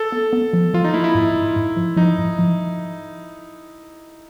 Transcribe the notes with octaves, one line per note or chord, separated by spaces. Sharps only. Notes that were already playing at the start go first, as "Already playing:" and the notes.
Already playing: A4
B3
B3
F3
F3 F4
D#4
A#3 E4
E4
G#2
G#2
G#2
F3
F3 D#4
G#2
F3